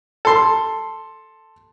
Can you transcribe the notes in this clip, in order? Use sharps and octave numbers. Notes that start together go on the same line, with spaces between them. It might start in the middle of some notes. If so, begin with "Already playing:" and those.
A4 C6